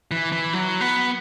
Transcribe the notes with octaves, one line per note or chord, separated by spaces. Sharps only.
E3
E3
F#3
B3